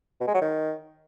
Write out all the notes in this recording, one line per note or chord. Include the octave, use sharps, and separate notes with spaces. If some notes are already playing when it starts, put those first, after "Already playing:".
B2
G#3
F#3
D#3